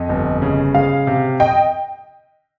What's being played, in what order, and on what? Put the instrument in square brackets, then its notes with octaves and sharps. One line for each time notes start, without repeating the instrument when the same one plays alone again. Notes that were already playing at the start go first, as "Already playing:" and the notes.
Already playing: [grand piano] F2 [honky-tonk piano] D#5
[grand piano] G1
C#3
[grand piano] G#3 [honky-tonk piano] F5
[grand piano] C3
[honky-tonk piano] D#5 G5